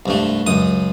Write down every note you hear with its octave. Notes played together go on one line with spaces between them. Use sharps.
C2 G2 A3
C#2 F#2 D#6